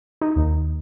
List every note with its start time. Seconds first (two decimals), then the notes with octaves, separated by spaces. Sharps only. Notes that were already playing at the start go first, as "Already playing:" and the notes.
0.21 D#4
0.36 D#2